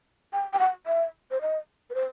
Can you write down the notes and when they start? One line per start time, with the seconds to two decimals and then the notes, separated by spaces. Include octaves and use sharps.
0.33 G5
0.53 G5
0.59 F#5
0.87 E5
1.31 C5
1.41 D#5
1.90 B4
1.95 C5